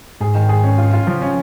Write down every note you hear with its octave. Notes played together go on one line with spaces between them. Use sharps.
G#2 G#4
D#3
G#4
C#4
F4
F4
C#3 F3
C#4